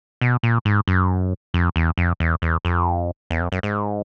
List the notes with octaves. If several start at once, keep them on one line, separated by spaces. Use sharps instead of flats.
B2
A#2
G#2
F#2
F2
E2
F2
E2
E2
F2
E2
F2
F#2
G#2